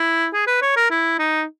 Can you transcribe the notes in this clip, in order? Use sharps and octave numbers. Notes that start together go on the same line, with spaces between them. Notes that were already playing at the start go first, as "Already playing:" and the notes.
Already playing: E4
G#4
B4
C#5
A#4
E4
D#4